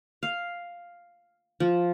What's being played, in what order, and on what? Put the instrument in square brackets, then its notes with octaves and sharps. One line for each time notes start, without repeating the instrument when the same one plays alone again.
[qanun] F5
F3